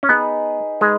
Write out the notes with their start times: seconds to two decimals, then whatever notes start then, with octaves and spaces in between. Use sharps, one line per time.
0.03 C#4
0.09 B3 D#4 G#4 B4
0.81 G#3 D#4 G#4 B4